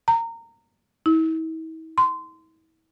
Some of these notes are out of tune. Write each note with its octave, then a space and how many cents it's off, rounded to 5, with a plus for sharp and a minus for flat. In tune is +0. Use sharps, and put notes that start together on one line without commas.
A#5 -20
E4 -45
C6 -20